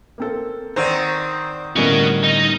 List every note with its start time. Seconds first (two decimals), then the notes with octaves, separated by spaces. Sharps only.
0.18 A#3 C4 A4
0.76 D#3 C4 C5 D5 F#5 A#5 E6
1.76 A2 D3 G3 A#3 B3 C#4 F#4 D#5
2.23 D#4 D#5